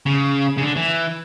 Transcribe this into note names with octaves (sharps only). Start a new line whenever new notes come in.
C#3
C#3
D3
E3